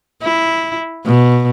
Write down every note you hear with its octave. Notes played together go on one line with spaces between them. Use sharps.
E4
B2